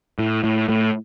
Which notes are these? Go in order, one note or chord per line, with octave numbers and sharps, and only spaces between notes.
A2
A2
A2